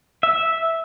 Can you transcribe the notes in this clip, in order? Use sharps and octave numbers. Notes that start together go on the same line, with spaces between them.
E5